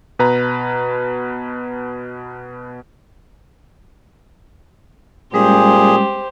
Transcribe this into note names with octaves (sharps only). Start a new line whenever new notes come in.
B2 B4 A#5
A#2 G3 G#3 C#4 G4 G#4 C5